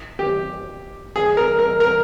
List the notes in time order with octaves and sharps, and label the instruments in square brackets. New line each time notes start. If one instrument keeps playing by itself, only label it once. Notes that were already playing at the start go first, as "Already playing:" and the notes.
[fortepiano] G4
G#4
A#4
A#4
A#4